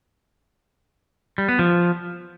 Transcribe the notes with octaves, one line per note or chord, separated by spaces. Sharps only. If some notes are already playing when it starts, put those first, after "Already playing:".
G3
B3
F3